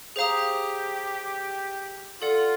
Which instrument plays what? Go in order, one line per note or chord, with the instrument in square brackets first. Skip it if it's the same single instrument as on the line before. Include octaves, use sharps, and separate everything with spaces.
[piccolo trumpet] G4 [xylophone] G#4 C5 F5 A#5 D#6
[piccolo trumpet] F4 [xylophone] A4 D5 F#5